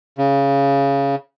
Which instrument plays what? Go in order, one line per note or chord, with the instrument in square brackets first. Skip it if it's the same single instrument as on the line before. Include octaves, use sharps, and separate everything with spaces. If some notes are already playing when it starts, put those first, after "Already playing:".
[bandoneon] C#3